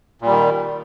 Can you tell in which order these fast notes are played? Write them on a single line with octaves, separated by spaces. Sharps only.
A#2 G3 D#3